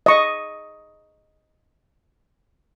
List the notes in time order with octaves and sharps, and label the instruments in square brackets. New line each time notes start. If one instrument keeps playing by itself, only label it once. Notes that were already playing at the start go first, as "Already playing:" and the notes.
[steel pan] D#5 C#6